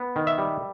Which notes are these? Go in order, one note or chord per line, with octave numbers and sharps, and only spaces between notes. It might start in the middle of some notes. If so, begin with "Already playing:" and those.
Already playing: B3
D#3
E5
G3